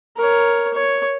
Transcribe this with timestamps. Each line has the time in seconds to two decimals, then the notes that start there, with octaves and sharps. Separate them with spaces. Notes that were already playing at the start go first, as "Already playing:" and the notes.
0.18 A#4 C#5
0.74 C#5